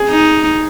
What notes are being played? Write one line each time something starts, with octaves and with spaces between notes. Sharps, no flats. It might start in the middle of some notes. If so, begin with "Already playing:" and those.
Already playing: G#4
D#4